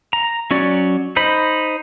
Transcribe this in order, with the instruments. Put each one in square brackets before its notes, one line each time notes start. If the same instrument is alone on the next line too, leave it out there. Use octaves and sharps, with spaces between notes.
[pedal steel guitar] A#5
F#3 C#4 F#4 D5
D#4 C5 B5